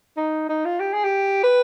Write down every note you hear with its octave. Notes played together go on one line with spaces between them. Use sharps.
D#4
D#4
F4
G4
G#4
G4
B4